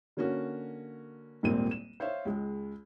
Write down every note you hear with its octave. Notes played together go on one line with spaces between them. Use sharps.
D3 A#3 C#4 F#4
D#1 G#1 A#2 A#3 C4 D#7
E7
C5 C#5 E5 F5
C#2 G#3